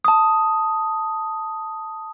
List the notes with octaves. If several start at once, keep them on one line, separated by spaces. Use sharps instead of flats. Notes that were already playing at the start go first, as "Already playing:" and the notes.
A5 D#6